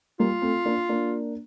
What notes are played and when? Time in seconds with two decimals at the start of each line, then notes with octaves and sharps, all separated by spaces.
0.19 G3 A#3 F4
0.42 A3 C4
0.66 A#3 D4
0.89 A#3 D4